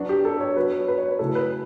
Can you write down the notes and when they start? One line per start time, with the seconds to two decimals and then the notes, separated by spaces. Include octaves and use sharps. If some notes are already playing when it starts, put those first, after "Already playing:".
Already playing: F#3 B3 D4 F#4
0.09 G4
0.25 A4
0.40 C#5
0.56 F#3 B3 F#4 B4
0.72 C#5
0.88 B4
0.98 C#5
1.09 B4
1.19 C#3 F#3 A3 E4 A4
1.35 B4